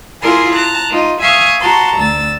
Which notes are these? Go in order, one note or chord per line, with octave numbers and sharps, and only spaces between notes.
E4 F4 G#4 A#4 G#5 C6
A5 A#5 F#6
D#4 F4
E5 F5 G#5 C#6 D#6 F6
F#4 A5 A#5 C6
D2 E6 A6